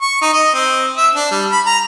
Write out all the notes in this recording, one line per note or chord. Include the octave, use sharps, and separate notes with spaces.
C#6
D#4
D#5
C4
E5
D4
G3
B5
A#5